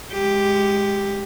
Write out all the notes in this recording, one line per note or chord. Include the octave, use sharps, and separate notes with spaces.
G#3 G4